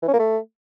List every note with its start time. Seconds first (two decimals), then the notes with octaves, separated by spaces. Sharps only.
0.02 E3
0.08 C#4
0.13 A#3
0.19 A3